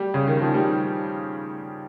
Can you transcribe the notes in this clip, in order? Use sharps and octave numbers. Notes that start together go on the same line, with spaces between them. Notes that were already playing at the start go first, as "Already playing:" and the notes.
Already playing: G3
C#3
D#3
F3
G3